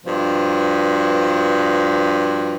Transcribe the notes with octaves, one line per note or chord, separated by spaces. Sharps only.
G2 B2 F3